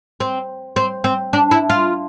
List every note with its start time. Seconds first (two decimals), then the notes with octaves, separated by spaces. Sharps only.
0.20 C4
0.76 C4
1.04 C4
1.33 D4
1.51 E4
1.70 F4